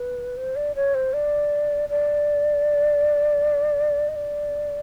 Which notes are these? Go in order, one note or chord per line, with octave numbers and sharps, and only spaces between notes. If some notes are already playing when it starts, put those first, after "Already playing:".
Already playing: B4
C5
D5
C#5
C5
D5
D5
D#5
D5